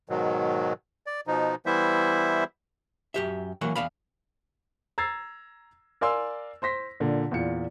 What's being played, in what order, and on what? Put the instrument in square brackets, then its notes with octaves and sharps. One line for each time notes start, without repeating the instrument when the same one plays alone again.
[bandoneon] G#2 B2 D#3 F#3
D5
B2 F3 D#4
E3 G3 B3 E4 C5 E5
[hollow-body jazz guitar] F#2 G4 E5
E3 F#3 A#3 F#5
E2 D5 F5 B5
[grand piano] A#5 E6 G#6 A6 C7
A#4 D5 F5 G#5 C6 E6
C5 C6 A#6 B6
A#2 D3
E2 A#2 F4 C#7